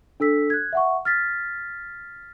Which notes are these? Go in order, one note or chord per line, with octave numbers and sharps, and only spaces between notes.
D4 A4 E6 B6
F#6 G#6
E5 F#5 C#6
F6 A6 B6